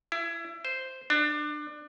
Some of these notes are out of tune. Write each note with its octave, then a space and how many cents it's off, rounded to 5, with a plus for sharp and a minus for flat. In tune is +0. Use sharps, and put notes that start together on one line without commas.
E4 +25
C5 -5
D4 +25